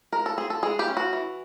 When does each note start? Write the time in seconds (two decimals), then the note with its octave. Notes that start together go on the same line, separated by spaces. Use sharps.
0.12 G#3 A#4
0.26 A4
0.38 C4 G#4
0.50 A4
0.63 G#3 G#4
0.79 G4
0.88 C#4
0.97 F#4
1.13 E3